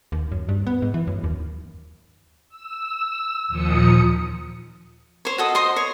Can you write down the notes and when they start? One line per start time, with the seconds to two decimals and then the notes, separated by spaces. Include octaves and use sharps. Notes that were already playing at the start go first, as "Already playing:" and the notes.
0.12 D#2
0.32 F#2
0.49 G2
0.67 B3
0.82 G#2
0.94 E3
1.07 F#2
1.24 D#2
2.49 E6
3.48 D#2 A#2 F3 D#6 C#7
5.25 C5 C#5
5.38 F#4 A4 D#5
5.55 C5 D#5 C6
5.76 C#5